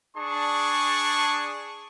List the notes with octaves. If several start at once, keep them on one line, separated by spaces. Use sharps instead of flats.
D4 G#4 A5 C#6